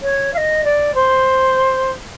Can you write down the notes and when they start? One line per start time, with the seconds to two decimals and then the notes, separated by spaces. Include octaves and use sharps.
0.02 C#5
0.33 F5
0.37 D#5
0.64 D5
0.94 C5